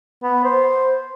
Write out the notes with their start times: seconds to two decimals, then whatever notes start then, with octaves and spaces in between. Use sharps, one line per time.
0.23 B3
0.44 C5